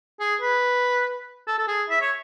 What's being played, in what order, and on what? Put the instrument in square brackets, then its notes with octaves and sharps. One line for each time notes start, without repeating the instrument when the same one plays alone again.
[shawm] G#4
B4
A4
A4
G#4
E5
C#5